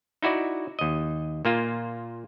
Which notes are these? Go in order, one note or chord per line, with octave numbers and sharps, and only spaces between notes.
D#4 E4 F#4 D5
D#2 D#5
A#2 A#3 F4